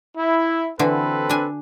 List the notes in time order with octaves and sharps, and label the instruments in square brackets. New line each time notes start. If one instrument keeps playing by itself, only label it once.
[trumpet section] E4
[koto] D3 E3 F#4 [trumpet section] C4 A4 B4
[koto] D4 G#5